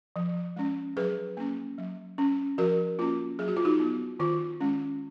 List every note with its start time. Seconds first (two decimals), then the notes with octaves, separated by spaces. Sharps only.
0.16 F3
0.56 G#3 C#4
0.97 F#3 G#4 B4
1.37 A#3 C#4
1.78 F#3
2.18 C#4
2.58 F3 F#4 A#4
2.99 A#3 C#4 F4
3.39 F#3 G#4
3.48 F#4
3.57 F4
3.65 D#4 F#4
3.80 B3
4.20 D#3 F4
4.61 G#3 C#4